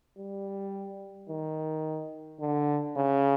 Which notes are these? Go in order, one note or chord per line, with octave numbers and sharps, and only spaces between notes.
G3
D#3
D3
C#3